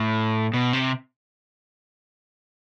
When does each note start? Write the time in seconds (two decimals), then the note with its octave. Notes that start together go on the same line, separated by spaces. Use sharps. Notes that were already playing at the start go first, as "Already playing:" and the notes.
Already playing: A2
0.54 B2
0.73 C3